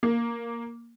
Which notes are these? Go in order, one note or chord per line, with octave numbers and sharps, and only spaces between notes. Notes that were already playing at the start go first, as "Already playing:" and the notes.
A#3